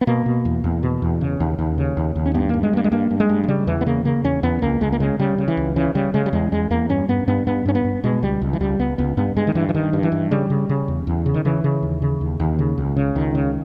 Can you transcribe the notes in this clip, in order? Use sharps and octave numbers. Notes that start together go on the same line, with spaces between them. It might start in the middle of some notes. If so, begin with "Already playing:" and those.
B3
B2 A#3
B2
E2
E2
B2
E2
C#3
D#2
D#2
C#3
D#2
D#2
C#4
G2 B3
G2 A#3
G#3
G2 A#3
G#3
G2 A#3
G2
G#3
G2
G#3
C#3 G3
E2 E3
B3
C#3 A#3
C#3 A#3
E2 C#4
E2 B3
C#2 A#3
C#2 G#3
A#3
C#3 G#3
C#3 G3
C#3
E3
C#2
C#3 E3
C#3 G3
C#3 G#3
G3
E2 G#3
E2 G#3
E2 A#3
G2 C#4
G2 B3
G2 B3
G2 B3
G2 C#4
B3
G2
B2 G#3
C#2 G3
C#2
E3
C#2 G3
C#2 B3
C#2 B3
G2 B3
G2 G#3
D#3
G2 E3
E3
G2 D#3
G2
E3
G2
C#3 G3
C#3
C#3
E2
E2
C#3
D#3
C#3 E3
C#3
D#2
C#3
D#2
D#2
C#3
C#2
C#3
C#2 D#3
C#3